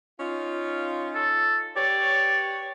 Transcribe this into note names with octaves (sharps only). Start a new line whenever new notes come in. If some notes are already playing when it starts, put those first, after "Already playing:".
C#4 D#4 F4
A4
G4 B4 C#5 D5